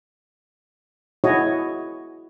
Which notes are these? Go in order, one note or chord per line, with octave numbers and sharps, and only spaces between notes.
E4 F#4 G#4 C#5 D#5